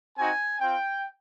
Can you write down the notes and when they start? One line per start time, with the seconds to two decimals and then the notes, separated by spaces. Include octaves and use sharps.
0.17 C4 D#4 F#4 G#5
0.60 C4 F4 G5